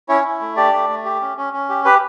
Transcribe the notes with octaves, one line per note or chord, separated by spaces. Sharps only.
C#4 E4 C#5
E4
A3
D4 G4 D5
A3
A3
G4
C#4
C#4
C#4
G4
G4 B4